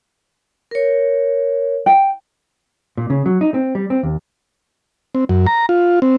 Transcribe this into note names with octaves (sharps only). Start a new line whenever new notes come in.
A#4 C#5
G5
A#2
C#3
F#3
D#4
C4
G3
C4
D#2
C4
F#2
A#5
F4
C4